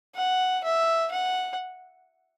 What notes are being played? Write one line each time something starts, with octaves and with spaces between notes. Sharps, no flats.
F#5
E5
F#5